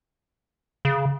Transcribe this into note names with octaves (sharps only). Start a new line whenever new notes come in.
C#3